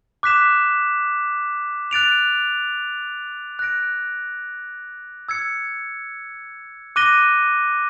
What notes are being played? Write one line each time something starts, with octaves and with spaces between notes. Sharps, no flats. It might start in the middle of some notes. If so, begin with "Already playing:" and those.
D6 F#6 B6 E7
F#6 A6 D7 F7
F#6 A#6 D7
E6 G#6 C#7
D6 F#6 A#6 D#7 G7